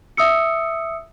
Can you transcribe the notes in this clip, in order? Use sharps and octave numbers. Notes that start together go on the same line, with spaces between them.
E5 D#6 E6 C#7